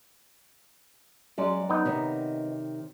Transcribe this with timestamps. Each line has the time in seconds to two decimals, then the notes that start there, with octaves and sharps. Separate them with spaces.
1.38 F#3 G#3 C#4 D5
1.69 B3 D#4
1.85 C3 D#3 C#5